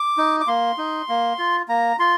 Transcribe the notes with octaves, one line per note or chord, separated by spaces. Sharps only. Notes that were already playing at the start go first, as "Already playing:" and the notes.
Already playing: D6
D#4
D6
A#3 C6
D#4
A#3
F4
A#3 A#5
F4 C6